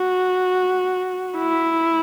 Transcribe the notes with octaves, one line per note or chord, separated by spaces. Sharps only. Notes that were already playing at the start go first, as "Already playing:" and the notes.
Already playing: F#4
E4